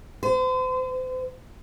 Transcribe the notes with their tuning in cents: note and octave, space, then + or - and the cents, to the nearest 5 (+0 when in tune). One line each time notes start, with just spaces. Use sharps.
C5 -40